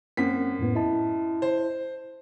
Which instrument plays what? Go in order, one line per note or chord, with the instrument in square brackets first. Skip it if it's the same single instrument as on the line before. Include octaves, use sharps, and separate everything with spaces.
[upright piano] F#2 B6 [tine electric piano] A#3 C4 F#5
[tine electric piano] F2 A2 B3
E4 D#5 A5
[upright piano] C5